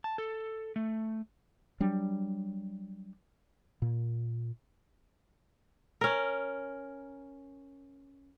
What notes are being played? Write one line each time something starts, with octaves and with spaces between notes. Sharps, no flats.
A5
A4
A3
F#3 G3 D4
A#2
C#4 A#4